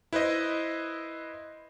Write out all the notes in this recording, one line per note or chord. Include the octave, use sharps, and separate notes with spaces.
E4 B4 C5 D#5